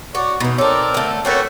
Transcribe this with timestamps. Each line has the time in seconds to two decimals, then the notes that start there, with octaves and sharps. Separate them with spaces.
0.15 F#4 C#5 D5
0.40 B2 E3 D#4
0.58 C4 D#4 A4 A#4 C#5 D5
0.94 D3 A3
1.25 A3 A#3 C4 C#4 F#4 B4